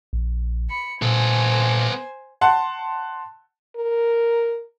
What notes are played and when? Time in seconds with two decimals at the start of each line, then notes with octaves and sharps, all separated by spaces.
0.13 A#1
0.70 B5 C#7
1.02 A#2 B3 A4 C5 G#5
2.41 F#5 A5 C6
3.77 A#4